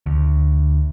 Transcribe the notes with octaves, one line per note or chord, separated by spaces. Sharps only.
D2